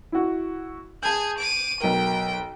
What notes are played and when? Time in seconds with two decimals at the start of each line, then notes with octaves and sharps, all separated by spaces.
0.12 E4 F#4
1.03 G#4 G#5 A5 G6
1.39 D6 D#7
1.81 B1 A#4 G5